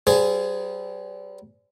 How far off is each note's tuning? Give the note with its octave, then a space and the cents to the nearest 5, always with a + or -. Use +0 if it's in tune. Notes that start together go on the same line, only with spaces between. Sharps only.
G3 -35 G#4 +0 C5 -35